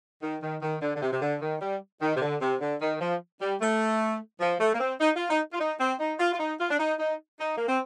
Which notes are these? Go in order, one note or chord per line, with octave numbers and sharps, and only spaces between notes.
D#3
D#3
D#3
D3
D3
C3
C3
D3
D#3
G3
D#3
C3
D3
C3
D3
D#3
F3
G3
A3
F3
A3
A#3
C4
D#4
F4
D#4
F4
D#4
C4
D#4
F4
F4
D#4
F4
D4
D#4
D#4
D#4
A#3
C4